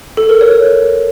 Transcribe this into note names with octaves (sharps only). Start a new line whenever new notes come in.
A4
A#4
C#5